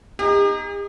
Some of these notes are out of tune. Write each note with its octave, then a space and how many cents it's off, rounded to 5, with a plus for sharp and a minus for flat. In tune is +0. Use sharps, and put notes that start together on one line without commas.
D#4 +0 G4 +45